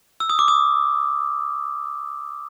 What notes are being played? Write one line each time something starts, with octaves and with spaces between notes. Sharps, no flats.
E6
D#6
D6
D#6